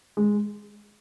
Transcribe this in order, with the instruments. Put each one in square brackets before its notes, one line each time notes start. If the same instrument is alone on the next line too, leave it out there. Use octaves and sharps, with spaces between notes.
[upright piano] G#3